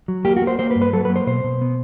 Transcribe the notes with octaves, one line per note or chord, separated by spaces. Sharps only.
F#3
A#3 G4
F#4
A#3
C5
A#3 C5
B4
G2
B4
F#3 A4
A#3 B4
C5
B2 C5
B2
B3